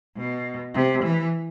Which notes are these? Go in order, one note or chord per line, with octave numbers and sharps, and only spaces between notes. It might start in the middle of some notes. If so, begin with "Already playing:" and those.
B2
C3
E3